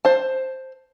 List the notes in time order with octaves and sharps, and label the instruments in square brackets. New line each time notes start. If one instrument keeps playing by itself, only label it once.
[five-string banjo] C5 A5